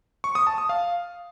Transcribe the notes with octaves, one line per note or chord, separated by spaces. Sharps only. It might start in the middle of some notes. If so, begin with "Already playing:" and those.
C#6
D#6
A5
D#6
F5